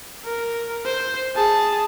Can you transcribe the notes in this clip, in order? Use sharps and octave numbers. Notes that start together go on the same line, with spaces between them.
A#4
C5
G#4 A5